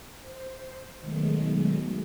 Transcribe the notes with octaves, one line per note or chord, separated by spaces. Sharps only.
C5
B2 D#3 F#3 G#3 A3